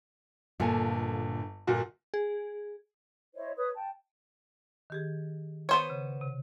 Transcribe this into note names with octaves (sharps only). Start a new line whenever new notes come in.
G1 A#2 D3 F4 A4 G#5
G1 A#2 F#4
G#4
E4 C5 C#5 D#5
B4 C#5 D#6
G5 A5
D#3 G4 G#4
B3 C5 C#5
C#3
C3